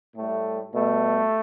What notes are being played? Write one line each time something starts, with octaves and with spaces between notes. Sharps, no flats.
A2 G3 A3
B2 G3 A3